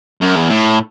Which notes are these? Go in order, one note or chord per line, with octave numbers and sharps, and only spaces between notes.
F#2
E2
A2